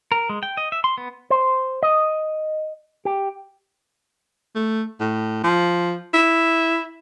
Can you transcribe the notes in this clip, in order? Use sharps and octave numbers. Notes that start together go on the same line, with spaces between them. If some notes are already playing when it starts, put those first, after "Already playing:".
A#4
G#3
G5
D#5
E5
C6
B3
C5
D#5
G4
A3
A2
F3
E4